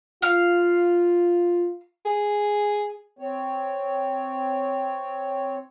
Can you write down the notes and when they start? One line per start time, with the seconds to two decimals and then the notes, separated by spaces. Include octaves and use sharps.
0.22 F4 F5
2.05 G#4
3.19 C4 C#5